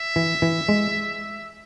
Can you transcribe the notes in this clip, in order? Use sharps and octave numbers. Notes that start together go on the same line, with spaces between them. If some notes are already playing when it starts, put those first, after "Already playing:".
Already playing: E5
E3
E3
G#3